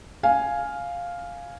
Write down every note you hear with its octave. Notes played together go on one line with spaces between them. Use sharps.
F5 G#5